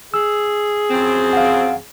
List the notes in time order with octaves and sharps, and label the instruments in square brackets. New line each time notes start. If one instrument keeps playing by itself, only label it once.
[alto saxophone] G#4 [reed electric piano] E6
[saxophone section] F#2 F3 C4
[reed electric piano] F5 F#5